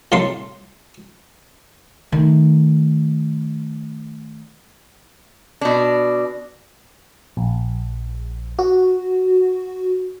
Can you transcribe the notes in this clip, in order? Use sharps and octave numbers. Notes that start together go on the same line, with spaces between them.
C2 A2 F#3 A3 C6
D#3 A3
B2 D4
A#1
F#4